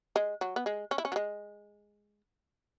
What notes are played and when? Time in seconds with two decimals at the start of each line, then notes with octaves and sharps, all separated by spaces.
0.16 G#3
0.41 F#3
0.56 B3
0.66 G#3
0.91 C#4
0.98 E4
1.05 C#4
1.12 F#3
1.16 G#3